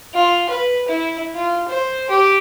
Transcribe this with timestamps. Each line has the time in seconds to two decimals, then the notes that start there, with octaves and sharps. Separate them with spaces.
0.14 F4
0.50 B4
0.88 E4
1.35 F4
1.69 C5
2.10 G4